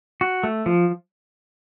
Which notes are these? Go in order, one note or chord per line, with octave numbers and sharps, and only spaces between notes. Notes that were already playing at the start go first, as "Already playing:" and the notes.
F#4
A3
F3